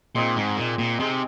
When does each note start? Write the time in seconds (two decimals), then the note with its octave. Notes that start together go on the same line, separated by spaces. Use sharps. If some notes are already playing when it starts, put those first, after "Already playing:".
0.15 A#2 G#3 C4 D#4 G#4
0.36 G#2
0.57 A#2
0.79 A#2
0.99 C3 G#3 C4 D#4 G#4